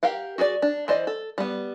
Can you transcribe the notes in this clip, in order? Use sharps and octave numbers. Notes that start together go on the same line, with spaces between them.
G4 A#4 F5 F#5
F#4 G#4 A4 D5
D4
E3 C5 D5 D#5
A4
G3 B3